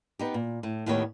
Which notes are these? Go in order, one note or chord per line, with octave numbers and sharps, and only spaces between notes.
B3 D#4 G4
A#2
A2
D#2 A2 D#3 B3 G4 C#5